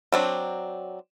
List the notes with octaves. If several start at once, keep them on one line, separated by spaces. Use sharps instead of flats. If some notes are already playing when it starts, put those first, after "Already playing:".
F#3 C4 D4